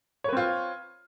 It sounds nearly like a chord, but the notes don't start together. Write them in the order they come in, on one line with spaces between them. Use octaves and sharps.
C#5 B4 C4 F4